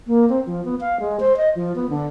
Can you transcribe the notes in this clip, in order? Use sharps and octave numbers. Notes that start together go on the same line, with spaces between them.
A#3
C4
F3
B3
F5
G#3
C5
D#5
F3
B3
D3